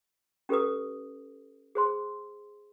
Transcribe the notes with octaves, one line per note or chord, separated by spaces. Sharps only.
C#4 G4 A4 B4 D#6
G#4 C5 C6